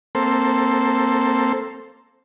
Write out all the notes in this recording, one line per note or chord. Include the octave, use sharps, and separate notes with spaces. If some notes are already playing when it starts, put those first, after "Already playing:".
A#3 C4 A4 C5